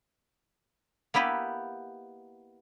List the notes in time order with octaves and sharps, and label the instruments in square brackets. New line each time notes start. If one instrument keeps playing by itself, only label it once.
[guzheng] A#3 B3 E4 G4 B4